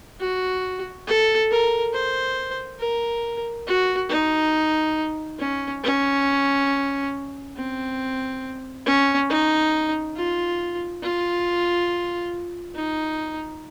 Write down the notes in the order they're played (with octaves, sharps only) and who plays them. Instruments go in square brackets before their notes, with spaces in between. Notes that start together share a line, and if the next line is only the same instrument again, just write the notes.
[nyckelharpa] F#4
A4
A#4
C5
A#4
F#4
D#4
C#4
C#4
C4
C#4
D#4
F4
F4
D#4